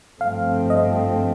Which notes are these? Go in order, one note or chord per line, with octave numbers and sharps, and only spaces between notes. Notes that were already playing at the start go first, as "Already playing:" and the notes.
G1 G2 F3 A3 C4 F5
D#5